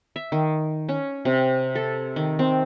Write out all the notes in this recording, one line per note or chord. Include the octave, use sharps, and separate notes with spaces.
E5
D#3
C#4
C3
A4
D#3
C4